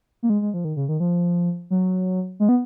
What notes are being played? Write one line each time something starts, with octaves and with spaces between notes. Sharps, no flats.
A#3
G#3
G#3
F3
D#3
C#3
D#3
F3
F#3
G#3
B3